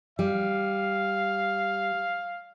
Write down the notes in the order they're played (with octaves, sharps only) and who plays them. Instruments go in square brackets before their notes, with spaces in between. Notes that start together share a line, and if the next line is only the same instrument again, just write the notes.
[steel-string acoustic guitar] G3 [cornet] F5